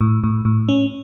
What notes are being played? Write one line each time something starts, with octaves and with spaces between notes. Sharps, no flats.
A2
A2
A2
C#4